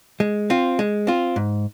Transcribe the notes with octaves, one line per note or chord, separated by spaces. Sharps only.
G#3
C4 F4
G#3
C4 F4
G#2